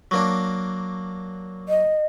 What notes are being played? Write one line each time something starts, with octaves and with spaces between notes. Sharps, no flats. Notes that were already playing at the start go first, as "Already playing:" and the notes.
F#3 A#3 D4
D#5